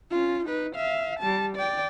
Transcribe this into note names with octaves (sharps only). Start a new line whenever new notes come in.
C#4 F4
D#4 B4
E5 F5
G3 A5
D5 G5